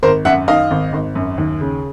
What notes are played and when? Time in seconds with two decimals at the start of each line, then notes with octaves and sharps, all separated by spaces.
0.03 G#1 A#4 C5
0.25 F#2 E5 F#5
0.48 D#3 D#5 F5
0.71 G#1
0.93 G#1
1.15 F#2
1.38 D#2
1.61 C#3